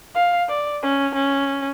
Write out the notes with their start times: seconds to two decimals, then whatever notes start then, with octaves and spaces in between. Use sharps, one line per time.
0.15 F5
0.48 D5
0.82 C#4
1.14 C#4